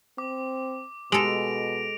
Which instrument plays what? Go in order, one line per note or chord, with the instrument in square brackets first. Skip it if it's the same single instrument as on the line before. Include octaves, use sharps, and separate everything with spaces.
[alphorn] C4 [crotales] D6
[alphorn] B2 [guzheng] G#3 A4 [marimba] G4 G#5 [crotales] A#6 D7 F7